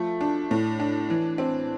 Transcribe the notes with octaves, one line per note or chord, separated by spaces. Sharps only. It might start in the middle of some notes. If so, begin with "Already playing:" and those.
Already playing: F3 A3
D4
A2
D4
E3
C4